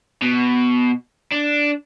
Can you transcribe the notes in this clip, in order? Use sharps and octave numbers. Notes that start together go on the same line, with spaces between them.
B2
D4